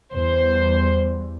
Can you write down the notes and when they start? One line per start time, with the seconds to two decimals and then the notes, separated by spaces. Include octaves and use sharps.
0.14 E2 G3 C5